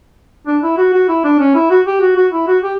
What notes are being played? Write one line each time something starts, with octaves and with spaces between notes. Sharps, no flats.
D4
E4
F#4
F#4
E4
D4
C#4
E4
F#4
G4
F#4
F#4
E4
F#4
G4